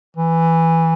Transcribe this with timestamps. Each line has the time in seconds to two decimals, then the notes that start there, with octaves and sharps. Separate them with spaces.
0.17 E3